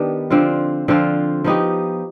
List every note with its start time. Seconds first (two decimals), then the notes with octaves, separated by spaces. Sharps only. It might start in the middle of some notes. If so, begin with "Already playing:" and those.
Already playing: D#3 B3 D4 G4
0.30 D3 F3 C4 F4
0.88 D3 F3 C4 F4
1.44 F3 B3 D#4 G4